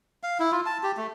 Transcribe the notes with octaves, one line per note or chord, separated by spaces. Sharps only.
F5
E4
F4
A5
G4
A3